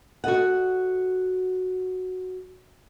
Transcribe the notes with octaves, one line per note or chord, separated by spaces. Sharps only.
F#4 A4 D#5 F#5